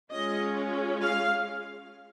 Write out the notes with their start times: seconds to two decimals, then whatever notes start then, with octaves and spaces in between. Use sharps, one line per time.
0.11 G#3 C#4 F4 D#5
1.00 F5